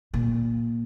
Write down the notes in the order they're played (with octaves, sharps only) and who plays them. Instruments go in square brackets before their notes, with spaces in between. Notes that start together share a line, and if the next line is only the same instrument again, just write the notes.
[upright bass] A#2